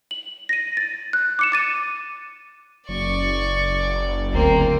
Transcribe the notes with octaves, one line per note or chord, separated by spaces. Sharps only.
F#7
A#6 D#7
A6
F#6
D6 C#7 E7
D6 A6 D#7
F#1 D5 C#6
D2 A#3 C4